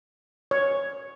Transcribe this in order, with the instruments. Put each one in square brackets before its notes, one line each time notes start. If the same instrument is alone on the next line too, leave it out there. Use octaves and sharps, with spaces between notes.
[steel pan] C#5